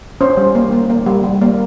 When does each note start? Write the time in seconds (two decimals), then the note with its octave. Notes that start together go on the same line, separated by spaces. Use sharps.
0.21 C#4 C5
0.37 G3
0.55 A#3
0.72 A#3
0.90 A#3
1.06 G3
1.24 G3
1.42 A#3